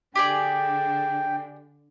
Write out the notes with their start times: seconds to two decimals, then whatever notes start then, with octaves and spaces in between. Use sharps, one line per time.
0.15 D3 D4 G4 G#4 D5 G5